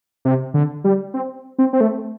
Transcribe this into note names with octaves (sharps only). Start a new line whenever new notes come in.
C3
D3
G3
C4
C4
C4
A3